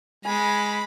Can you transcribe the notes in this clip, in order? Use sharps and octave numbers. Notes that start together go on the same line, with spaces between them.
G#3 G#5 B5